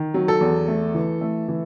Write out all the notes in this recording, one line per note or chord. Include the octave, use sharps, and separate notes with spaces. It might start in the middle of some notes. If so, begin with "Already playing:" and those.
Already playing: D#3
F#3
A4
E2
A3
E3
A3
E3